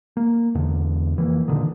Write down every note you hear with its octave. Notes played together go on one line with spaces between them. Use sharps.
A#3
E2 D3
F1 E3 A#3
A#2 D3 D#3